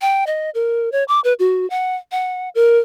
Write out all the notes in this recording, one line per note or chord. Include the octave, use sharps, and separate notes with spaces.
G5
D#5
A#4
C#5
D6
B4
F#4
F#5
F#5
A#4